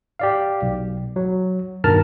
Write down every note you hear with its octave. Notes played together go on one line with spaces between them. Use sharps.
G4 D5 F5
B1
F#3
G2 B2 D#3 A#4 A5 F6